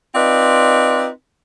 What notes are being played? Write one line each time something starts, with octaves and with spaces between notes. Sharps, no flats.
C4 D#4 F4 B4 D5